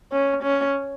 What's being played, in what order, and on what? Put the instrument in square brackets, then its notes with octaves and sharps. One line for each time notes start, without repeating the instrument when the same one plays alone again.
[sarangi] C#4
C#4